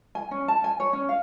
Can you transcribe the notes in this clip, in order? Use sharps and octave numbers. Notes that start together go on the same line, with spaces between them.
G#5
C#4
A5
G#5
C#5
C#4
F5